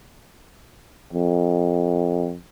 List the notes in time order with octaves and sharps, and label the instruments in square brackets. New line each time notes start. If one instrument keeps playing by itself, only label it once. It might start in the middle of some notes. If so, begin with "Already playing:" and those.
[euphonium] F2